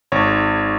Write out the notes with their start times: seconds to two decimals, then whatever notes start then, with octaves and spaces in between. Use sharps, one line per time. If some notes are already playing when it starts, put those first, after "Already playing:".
0.12 G#1 C#5